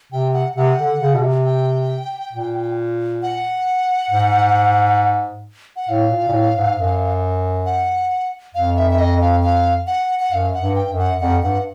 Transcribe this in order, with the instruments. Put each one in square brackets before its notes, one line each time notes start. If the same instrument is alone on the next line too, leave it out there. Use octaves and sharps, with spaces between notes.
[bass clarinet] C3 [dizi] G5
[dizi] F#5
[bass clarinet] C3 [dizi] F#5
[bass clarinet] D3
C#3
B2
C3
[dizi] G5
[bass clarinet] A#2
[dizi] F#5
[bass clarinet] G#2
[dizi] F#5
[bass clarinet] A2 [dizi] F5
[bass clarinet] A#2
A#2
A2
G#2
F#2
[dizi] F#5
[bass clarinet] F2 [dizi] F5
[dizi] E5
E5
D#5
F5
F5
F#5
F#5
[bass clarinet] F#2 [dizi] F5
[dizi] F#5
[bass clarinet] G2
[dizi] G5
[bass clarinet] F#2
[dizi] F#5
[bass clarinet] F2 [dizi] F#5
[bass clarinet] G2 [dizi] F#5